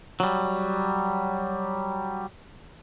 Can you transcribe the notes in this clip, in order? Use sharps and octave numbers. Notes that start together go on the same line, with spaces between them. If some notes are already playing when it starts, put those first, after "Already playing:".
F#3 G3